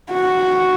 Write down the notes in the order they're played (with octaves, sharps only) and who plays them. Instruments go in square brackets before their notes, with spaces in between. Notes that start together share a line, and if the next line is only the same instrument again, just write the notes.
[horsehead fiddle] F#4